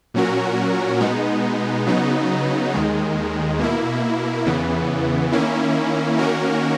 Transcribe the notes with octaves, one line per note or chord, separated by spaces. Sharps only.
A#2 F#3 C#4 F#4 A#4
B2 G#3 B3 D#4
C#3 F#3 B3 D#4
D#2 D#3 G#3
B2 A#3 E4
E2 C#3 E3 B3
D#3 A#3 C#4 E4
D#3 A#3 C#4 F#4 A#4